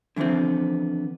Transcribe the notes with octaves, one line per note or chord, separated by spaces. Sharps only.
D3 E3 F3 B3 C4